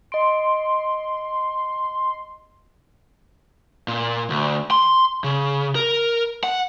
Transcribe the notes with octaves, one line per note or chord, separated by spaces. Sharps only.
D#5 C6 D7
A#2
D2
C6
C#3
A#4
F#5